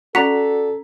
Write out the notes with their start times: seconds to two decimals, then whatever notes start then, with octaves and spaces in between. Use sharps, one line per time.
0.15 C#4 F#4 A4 D5 A#5 B6